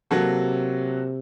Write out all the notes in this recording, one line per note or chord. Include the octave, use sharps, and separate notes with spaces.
C3 F#3 A#3 F#4 A4